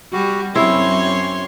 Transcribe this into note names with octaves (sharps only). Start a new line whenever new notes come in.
G3 F#4
F#2 C4 E4 C#5 C6